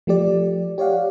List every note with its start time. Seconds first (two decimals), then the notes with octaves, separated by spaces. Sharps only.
0.07 F3 A3 G4 D5
0.78 G4 C#5 D5 F5 F#5